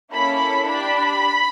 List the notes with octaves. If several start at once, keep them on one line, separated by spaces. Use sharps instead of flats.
A#3 C#4 E4 A4 B5
D4 G4 B5